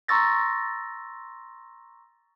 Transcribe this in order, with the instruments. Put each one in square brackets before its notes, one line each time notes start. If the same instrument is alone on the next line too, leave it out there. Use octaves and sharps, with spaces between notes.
[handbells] A#5 C6 C#6 E6 A6 A#6